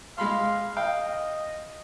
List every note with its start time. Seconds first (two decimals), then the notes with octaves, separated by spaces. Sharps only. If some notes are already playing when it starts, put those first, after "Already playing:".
0.18 G#3 F5 B5 C6
0.77 D#5 F5 G5